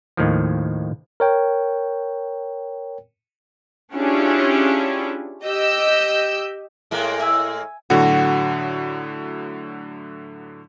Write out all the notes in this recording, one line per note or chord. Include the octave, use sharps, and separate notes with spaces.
D#2 A2 D#3 F3
A#4 C#5 G5
C#4 D4 E4 F4 G4 G#4
G4 D#5 E6 G6
A2 G#3 A#3
E5 G#5 E6
A2 D3 F#3 F#4